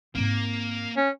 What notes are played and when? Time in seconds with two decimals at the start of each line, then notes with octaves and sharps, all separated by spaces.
0.15 G#2 A#3 C4
0.97 C#4